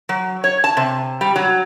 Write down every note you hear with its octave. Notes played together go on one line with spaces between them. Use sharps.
F#3
C#5
A5
C3
G3
F#3